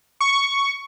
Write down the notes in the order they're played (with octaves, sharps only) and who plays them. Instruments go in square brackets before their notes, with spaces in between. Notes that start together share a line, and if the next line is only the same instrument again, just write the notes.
[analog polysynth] C#6